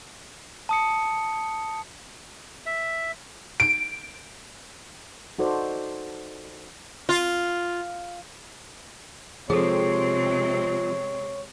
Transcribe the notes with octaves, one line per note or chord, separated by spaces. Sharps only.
A5 D#6 C#7
E5
D7
D#4 F#4 A4 C5 D5
F4
C3 F3 G#3 C4 G#4 A4 C#5